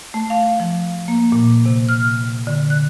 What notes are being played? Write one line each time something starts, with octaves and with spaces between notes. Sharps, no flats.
A3
F5
F3
A#3
A#2
C3
F6
D3
F#6